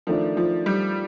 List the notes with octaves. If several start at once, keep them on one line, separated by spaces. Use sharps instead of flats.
D#3 F3 A3 D4
F3
G3